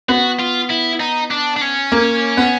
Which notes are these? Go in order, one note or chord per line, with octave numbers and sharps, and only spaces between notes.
B3 F#4
F4
E4
D#4
D4
D4
C#4
A#3
B3